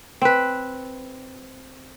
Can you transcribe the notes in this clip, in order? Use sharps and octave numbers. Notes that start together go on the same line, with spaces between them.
C4 B4